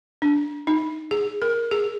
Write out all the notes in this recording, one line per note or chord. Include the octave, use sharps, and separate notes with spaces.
D4
D#4
G#4
A#4
G#4